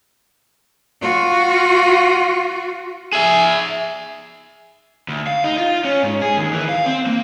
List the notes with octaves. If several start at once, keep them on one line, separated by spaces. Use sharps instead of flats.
F4 F#4
G#4 E5
D2
F5
D#4
F4
C#4
G#2
G#4
D#2
E3
F5
C4
A#3